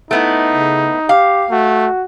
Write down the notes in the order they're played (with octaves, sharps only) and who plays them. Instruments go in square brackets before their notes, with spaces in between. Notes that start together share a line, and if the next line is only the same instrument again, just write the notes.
[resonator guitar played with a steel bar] A3 B3 E4 [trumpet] D#4
[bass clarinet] C#3
[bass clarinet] G4 [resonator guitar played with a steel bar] F5
[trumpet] A3 [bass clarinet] F#4